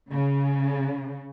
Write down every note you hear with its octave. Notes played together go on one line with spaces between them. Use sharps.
C#3